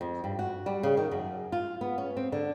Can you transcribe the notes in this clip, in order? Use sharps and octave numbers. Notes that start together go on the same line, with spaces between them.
F2
G2
F#4
G3
C#3
D#3
F#2
F4
B3
C#4
C4
D3